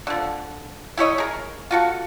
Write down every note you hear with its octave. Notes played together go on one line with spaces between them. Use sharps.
D3 F3
E4 G4 C#5 D#5
G#4 A#4
F4 F#4 A4